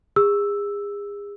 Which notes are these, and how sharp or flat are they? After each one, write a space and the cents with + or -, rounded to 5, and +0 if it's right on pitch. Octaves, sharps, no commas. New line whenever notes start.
G#4 -35 E6 +0